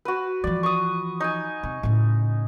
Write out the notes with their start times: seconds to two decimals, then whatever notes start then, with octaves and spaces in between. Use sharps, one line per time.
0.05 F#4 B4
0.44 E3 F3 D5
0.63 C#6 D#6
1.20 D#4 G#5
1.63 C3
1.83 A2 C#3